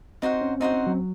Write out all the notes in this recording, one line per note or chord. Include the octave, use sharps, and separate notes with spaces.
C4 D#4 F#4 C5 F#5
C#4
C4 D#4 F#4 C5 F#5
C4
F#3